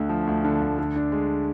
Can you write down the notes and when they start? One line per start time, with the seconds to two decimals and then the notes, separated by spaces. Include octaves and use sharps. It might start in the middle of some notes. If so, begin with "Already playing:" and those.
Already playing: D2 D3
0.09 F3
0.27 D2
0.45 D3
0.61 D2
0.79 D3
0.96 D4
1.12 G#3